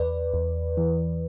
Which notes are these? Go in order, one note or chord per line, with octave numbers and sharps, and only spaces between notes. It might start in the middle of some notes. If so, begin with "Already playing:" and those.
Already playing: E2 B4 D5
E2
E3